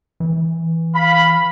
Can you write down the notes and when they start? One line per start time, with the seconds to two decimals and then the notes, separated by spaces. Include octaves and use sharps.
0.20 E3
0.94 F5 B5